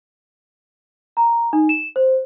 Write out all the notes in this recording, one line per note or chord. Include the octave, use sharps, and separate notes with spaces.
A#5
D#4
E7
C5